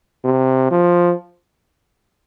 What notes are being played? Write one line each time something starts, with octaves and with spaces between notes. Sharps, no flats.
C3
F3